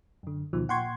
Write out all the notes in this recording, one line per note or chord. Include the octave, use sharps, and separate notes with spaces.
F#2 D3
D2 B2 D#3 F3
A#2 F#5 G5 C6 C#6 G#6